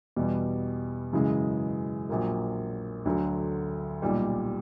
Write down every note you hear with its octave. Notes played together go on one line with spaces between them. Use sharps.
E2 B2 G3
F#2 C#3 E3 G#3
A#1 A#2 F#3 A#3
D2 D3 F#3 A3
B1 A#2 G3